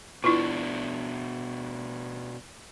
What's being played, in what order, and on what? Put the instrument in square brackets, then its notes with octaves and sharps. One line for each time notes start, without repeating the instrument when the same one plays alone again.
[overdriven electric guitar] B2 D4 [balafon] E4 F4 [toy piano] B4 C#6